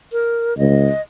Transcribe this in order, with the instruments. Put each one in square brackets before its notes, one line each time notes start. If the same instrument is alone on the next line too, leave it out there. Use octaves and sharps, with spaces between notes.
[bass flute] A#4
[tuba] C#2 [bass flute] D#5